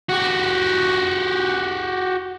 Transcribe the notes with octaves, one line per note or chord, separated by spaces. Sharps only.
F#4 G4